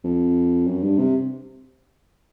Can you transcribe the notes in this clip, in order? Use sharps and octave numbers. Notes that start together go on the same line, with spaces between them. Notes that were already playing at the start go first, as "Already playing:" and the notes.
F2
F#2
G2
C3